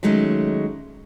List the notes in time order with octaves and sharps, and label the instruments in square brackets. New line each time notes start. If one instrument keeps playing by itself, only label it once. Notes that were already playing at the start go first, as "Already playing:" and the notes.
[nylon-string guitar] D#3 F#3 G#3 A3 C#4 D#4